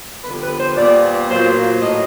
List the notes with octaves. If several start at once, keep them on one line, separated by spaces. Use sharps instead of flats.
F2 D3 G3 B3 B4
B4
C5
A#2 G3 B3 D5
A#2 F#3 A#3 C5
A2 F#3 A#3 D#5